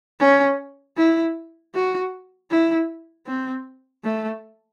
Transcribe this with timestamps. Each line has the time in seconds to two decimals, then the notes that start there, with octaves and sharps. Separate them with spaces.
0.20 C#4
0.97 E4
1.74 F#4
2.51 E4
3.27 C4
4.04 A3